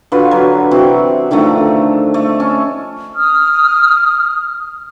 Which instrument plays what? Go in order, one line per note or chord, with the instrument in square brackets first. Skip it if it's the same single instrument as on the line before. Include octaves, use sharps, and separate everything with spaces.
[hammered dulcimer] D3 F4 F#4 B4
F#3
C3 E3 C4 F#4
D3 D#3 F3 A3
A3
C#4
[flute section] D#6 F6